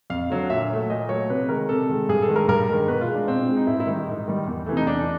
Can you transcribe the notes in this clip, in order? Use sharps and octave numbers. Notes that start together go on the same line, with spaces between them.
F2 F5
D3 F#3
A#2 E5
F#3 A3
A#2 D#5
F#3 A3 C#5
C3 B4
D#3 G#3 A#4
C3 A4
D#3 G#3
G2 G#4
A4
D#3 G#3
A#4
G2 A#4
D#3 G#3
B2 B4
F4
G#3
D4
B2 C4
G#3
D#4
G#2 E4
E4
D#3 G3 D#4
G#2
D#3 G3
E2
C3 E3 A3
D#4
E2 D4